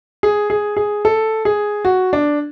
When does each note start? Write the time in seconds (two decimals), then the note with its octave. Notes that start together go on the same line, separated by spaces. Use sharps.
0.23 G#4
0.50 G#4
0.77 G#4
1.05 A4
1.45 G#4
1.85 F#4
2.13 D4